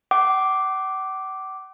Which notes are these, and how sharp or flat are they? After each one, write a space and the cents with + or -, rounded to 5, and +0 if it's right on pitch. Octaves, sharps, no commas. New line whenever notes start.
F#5 +45 D6 +0